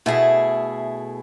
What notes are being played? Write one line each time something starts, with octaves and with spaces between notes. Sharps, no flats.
B2 A3 E4 G#4